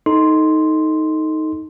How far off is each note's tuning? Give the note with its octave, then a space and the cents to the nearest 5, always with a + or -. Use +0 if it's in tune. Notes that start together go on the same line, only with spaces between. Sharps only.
D#4 +10 A4 +0 C6 +0